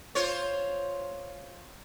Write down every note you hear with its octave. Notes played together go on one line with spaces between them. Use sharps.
F4 C5 C#5